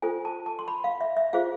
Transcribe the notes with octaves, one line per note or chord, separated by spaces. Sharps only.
F4 A4 C5 G#5
A5
A5
C6
B5
F5
E5
E5
F4 G#4 C5 F5